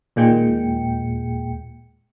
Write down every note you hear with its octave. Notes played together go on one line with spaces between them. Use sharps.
D#2 A#2 G#3 G5 C#7